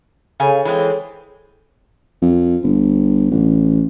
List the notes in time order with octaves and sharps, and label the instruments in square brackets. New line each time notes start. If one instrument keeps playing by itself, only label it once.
[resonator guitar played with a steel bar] C#3 F5 G#5 [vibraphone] G#4 A4 C#5
[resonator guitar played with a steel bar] E3 G#3 C4
[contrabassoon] F2
G1
A1